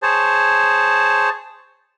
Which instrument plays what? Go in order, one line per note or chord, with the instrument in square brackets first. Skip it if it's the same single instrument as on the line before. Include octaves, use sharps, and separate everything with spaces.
[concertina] G#4 C5 C#5 A5